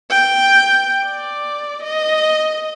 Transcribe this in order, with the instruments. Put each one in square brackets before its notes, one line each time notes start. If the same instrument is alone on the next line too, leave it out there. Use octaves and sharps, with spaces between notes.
[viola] G5
D5
D#5